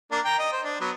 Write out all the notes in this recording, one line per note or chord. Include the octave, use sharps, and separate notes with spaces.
A#3 D4 A#4
G5 A#5
D#5
C5
D4
F#3 B3